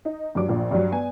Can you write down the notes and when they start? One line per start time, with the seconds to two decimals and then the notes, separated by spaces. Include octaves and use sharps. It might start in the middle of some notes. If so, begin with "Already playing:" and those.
0.05 D#4
0.35 G2 F#3 D6
0.48 A#1 A#2 F3
0.71 G2 F#3
0.92 B3 G#5